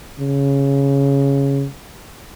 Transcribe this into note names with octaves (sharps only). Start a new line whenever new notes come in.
C#3